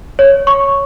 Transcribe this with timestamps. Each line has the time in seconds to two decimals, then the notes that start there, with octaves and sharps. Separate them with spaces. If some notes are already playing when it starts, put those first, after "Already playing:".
0.19 C#5
0.47 C#6